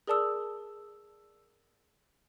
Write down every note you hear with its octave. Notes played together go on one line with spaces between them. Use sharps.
G#4 A#4 D5 A5 D#6 E6